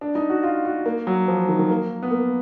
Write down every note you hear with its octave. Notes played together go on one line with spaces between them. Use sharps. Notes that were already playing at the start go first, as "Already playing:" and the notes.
D4
D#4
F#4
F4
F#4
A#3
F#3
F3
D#3
D#3
A#3
B3
A#3